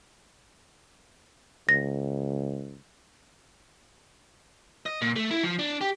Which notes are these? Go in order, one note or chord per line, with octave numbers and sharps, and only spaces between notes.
C#2 A#6
D#5
A#2
A3
E4
F3
D4
G4